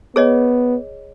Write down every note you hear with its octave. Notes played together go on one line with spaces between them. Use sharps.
B3 G#4 C#5 D#5